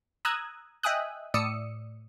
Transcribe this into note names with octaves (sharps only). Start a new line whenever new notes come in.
A#5 D#6 E6 F#6 G#6
D#5 E5 G5 G#5 D#6 F#6
A2 D5 D#6 E6 C#7